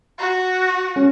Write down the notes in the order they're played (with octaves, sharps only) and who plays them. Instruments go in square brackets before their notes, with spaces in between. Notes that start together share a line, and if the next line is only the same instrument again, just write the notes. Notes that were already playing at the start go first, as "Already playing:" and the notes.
[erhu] F#4
[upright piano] C#4